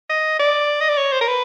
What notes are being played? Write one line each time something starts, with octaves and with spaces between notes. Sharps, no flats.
D#5
D5
D#5
D5
C#5
C5
A#4
B4